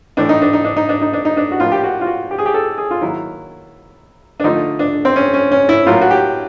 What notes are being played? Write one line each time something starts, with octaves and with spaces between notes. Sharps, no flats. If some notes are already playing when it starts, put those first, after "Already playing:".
A2 E3 A3 D4
D#4
D4
D#4
D4
D#4
D4
D#4
D4
D#4
D4
F#4
A2 F3 A#3 F4
G4
F#4
F4
F#4
G4
G#4
G4
A4
G#4
F4
D#3 F#3 A#3 E4
D4
D3 F3 A3 D#4
D4
C4
C#4
C#4
C#4
E4
A2 F#3 A#3 F4
F#4
G4